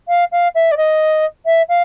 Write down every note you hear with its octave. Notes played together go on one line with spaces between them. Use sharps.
F5
F5
E5
D5
D#5
E5
F5